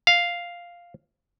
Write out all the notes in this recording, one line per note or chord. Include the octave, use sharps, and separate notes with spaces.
F5